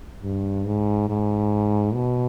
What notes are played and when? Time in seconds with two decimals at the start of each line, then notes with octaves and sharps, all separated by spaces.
0.23 G2
0.66 G#2
1.09 G#2
1.94 B2